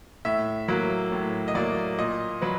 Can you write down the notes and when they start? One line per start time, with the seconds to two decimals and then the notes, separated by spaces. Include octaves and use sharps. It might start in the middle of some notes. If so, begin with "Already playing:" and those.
0.25 A2 E5
0.68 F#3 A#3
1.12 A2
1.48 D#5
1.55 F#3 A#3 D5
1.98 A#2 D#5
2.42 F#3 B4